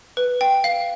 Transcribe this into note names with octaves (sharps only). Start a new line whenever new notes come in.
B4
G5
F5